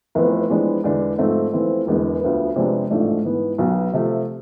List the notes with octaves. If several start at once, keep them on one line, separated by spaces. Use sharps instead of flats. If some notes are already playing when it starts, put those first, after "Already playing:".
F1 F2 E3 B3
F2 E3 G#3 B3 D4
E1 E2 D3 G#3 D4
G#2 F3 A3 C4
F2 E3 A3 C4 F4
E1 E2 D3 G#3 B3
D2 D3 F3 B3
F2 C3 G#3 B3 D4
A1 G#2 F3 A3 D4
G#2 E3 B3
B1 B2 B3
C3 F3 A3